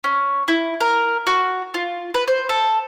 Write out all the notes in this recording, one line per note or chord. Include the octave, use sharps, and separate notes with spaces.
C#4
E4
A#4
F#4
F4
B4
C5
A4